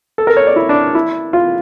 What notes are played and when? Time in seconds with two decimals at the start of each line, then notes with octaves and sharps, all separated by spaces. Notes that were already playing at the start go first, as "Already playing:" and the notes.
0.18 A4
0.27 A#4
0.37 C#5
0.47 D5
0.56 E4
0.69 D4
0.95 E4
1.33 F4